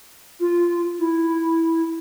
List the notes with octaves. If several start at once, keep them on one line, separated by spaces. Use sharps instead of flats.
F4
E4